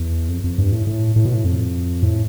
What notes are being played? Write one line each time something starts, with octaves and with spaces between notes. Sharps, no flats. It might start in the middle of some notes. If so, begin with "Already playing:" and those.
Already playing: E2
F2
F2
G2
A2
A2
A2
B2
A2
F2
A2